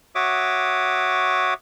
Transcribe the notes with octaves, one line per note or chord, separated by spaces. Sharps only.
F#4 C#5 E5 D6 D#6